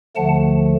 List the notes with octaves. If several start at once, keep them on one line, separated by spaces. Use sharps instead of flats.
D2 D3 F3 A3 F#5 A5